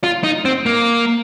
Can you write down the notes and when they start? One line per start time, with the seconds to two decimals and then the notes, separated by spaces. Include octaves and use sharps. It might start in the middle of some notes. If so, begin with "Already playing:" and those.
0.04 F4
0.24 D#4
0.45 C4
0.66 A#3